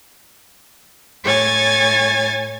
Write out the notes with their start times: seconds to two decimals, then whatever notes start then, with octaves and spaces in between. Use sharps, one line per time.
1.23 A2 C#5 G#5 G#6 A6